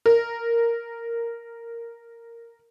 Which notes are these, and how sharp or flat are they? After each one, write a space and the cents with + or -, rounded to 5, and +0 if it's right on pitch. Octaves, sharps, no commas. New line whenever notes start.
A#4 -5